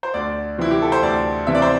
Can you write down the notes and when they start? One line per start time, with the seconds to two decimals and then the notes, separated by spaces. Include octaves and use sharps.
0.03 C5
0.14 D2 D5
0.58 C3 E3 C4 E4
0.71 G4
0.82 A4
0.92 C5
1.03 D2 D5
1.47 C3 E3 C4 E5
1.55 D5
1.62 C5